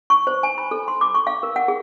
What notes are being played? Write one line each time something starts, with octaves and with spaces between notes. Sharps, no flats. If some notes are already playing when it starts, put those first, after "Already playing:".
C#6
C5
G#5
B5
A4
C6
D6
C#6
F5
A#4
F#5
G#4